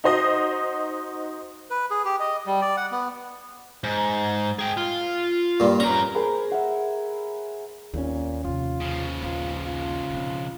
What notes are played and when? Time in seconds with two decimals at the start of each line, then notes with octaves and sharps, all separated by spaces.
0.04 D#4 F#4 C5 D#5
1.70 B4
1.91 G#4
2.05 G4
2.20 D#5
2.46 G3
2.61 D5
2.77 F#5
2.91 B3
3.84 G#2
4.59 G#4 G5
4.77 F4
5.60 G2 A#2
5.80 C#4 A#4 A#5
6.15 G#4 A#4 C5 B5
6.51 E5 F#5
7.94 D#2 A#2 C4 C#4
8.44 F2 C3 F4
8.80 C#3 F3
9.22 A#1 F4
9.65 F4
10.10 B2 C4